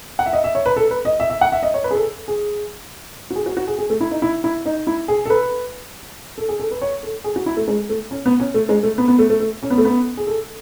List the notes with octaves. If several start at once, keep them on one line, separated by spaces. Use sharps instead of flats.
F#5
E5
D#5
E5
C#5
B4
A4
B4
D#5
E5
E5
F#5
E5
D#5
C#5
B4
G#4
A4
G#4
F#4
G#4
F#4
F#4
G#4
G#4
A3
E4
D#4
E4
E4
D#4
E4
G#4
A4
B4
A4
G#4
A4
B4
C#5
A4
G#4
F#4
E4
A3
G#3
A3
C#4
B3
C#4
A3
G#3
A3
B3
B3
A3
A3
A3
C#4
B3
A3
B3
G#4
A4